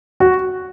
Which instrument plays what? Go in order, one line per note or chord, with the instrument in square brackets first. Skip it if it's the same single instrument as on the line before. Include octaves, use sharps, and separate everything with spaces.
[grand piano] F#4